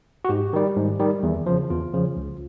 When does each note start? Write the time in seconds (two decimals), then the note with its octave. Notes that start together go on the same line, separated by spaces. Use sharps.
0.25 F#4
0.29 G#2 G4
0.53 D#3 G3
0.77 G#2
0.99 D#3 G3
1.23 E2
1.46 C#3 F3
1.70 E2 F4
1.94 C#3 F3
2.17 C#2